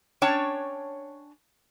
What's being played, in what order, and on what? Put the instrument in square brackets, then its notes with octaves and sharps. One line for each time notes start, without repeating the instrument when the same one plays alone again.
[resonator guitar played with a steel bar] C#4 D4 C#5 G5 A5